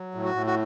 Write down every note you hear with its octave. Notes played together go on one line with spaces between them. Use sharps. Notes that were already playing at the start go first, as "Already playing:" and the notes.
Already playing: F#3
A2
F#4
A2
F#4